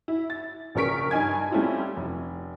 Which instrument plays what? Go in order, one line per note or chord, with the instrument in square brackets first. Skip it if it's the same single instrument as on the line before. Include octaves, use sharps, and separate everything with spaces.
[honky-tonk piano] E4
A6
A#1 C#3 A#4 C#6 B6 D7
G2 D#4 G#5 G#6
G3 A3 C4 C#4 E4 F4
F1